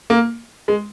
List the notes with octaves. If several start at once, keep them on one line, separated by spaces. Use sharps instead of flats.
A#3
G#3